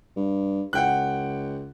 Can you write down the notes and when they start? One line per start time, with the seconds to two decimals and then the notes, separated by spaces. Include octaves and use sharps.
0.16 G2
0.73 C#2 F#5 G5 F#6